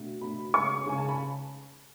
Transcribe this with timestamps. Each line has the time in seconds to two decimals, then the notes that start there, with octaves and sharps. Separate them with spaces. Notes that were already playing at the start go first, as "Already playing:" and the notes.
Already playing: B2 A3 D4
0.21 B2 A3 D4 B5
0.54 C#3 G#3 C#4 C#6
0.86 C#3 G#3 C#4 G#5
0.98 A5
1.08 B5